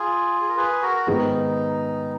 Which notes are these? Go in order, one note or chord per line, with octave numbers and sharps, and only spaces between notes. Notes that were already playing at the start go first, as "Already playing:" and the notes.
Already playing: F4 G#4
G#4
A#4
G#4 B4
F#4 A#4
G#2 D#3 G#3 B3 D#4